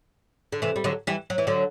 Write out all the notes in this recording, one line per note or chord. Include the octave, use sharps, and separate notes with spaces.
D3
C3 E3
G3
D3 F#3
E3 G3
F#3
E3
D3 F#3